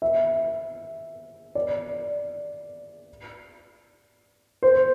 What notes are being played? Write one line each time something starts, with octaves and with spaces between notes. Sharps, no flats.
E5
D5
C5